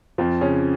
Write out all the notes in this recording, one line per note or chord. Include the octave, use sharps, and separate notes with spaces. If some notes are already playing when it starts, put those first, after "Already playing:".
F2 F3
C#3 C#4